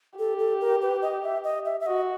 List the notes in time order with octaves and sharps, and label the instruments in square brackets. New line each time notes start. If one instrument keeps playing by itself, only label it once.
[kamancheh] G4 [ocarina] A4
[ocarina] A4
A#4
B4
D#5
E5
D#5
E5
E5
[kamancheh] F#4 [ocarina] D#5